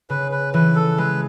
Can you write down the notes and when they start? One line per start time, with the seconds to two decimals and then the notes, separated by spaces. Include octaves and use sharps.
0.10 C#3 B4
0.32 B4
0.54 E3 B4
0.75 A4
0.98 G#3 B4